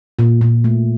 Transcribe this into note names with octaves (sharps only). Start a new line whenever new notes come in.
A#2
A#2
A3